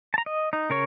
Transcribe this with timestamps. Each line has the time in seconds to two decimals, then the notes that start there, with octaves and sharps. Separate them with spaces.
0.14 A5 A#5
0.26 D#5
0.53 D#4
0.70 C#3 A#4 C#5